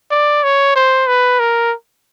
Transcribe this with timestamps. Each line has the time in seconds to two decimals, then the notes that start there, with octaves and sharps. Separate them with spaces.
0.11 D5
0.44 C#5
0.75 C5
1.07 B4
1.39 A#4